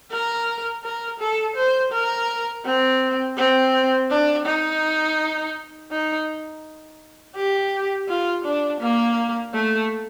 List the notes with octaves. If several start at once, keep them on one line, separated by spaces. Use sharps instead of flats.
A#4
A#4
A4
C5
A#4
C4
C4
D4
D#4
D#4
G4
F4
D4
A#3
A3